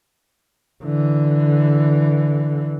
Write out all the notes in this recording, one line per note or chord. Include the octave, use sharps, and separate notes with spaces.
D3 E3